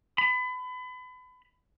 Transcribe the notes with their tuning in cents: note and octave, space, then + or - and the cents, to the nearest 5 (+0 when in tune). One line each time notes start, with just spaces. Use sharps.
B5 +30